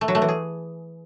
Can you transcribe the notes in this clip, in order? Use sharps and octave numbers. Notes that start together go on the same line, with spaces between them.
A3
F#3
A3
E3
G#4